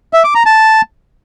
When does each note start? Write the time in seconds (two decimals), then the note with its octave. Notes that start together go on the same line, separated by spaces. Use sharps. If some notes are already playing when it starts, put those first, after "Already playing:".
0.13 E5
0.24 D6
0.35 A#5
0.46 A5